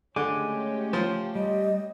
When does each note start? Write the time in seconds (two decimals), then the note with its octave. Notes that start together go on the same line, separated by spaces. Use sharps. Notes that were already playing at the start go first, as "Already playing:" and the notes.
0.16 D3 G#3 A3 C#4 G4 G#5 D6
0.93 F3 C5
1.35 G3 D#5